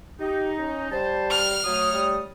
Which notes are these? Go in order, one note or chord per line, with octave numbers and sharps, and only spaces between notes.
D#4 G4
C#4
G3 C5 A5
F6
F#3 A3 C#5 D#6
G3